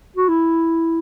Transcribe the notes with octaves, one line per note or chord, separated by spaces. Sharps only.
F#4
E4